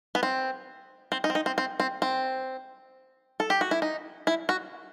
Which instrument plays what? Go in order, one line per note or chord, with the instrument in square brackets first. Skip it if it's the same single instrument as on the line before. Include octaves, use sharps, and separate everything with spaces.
[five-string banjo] B3
C4
C4
D#4
C4
D#4
C4
C4
C4
C4
A4
G4
F#4
E4
D#4
E4
F#4